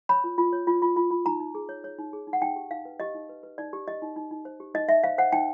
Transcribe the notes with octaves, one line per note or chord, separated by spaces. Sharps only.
C#5 B5
F4
F4
C#5
F4
F4
F4
F4
D#4 A#5
D#4
G#4
C#5
C#5
D#4
G#4
D#4
F#5
D#4 G5
G4
D#4 F5
B4
G4 D#5
D#4
B4
B4
D#4 D5
G4
G4 D#5
D#4
D#4
D#4
C5
G4
D#4 D#5
D#4 E5
C5 F5
C5 F#5
D#4 G5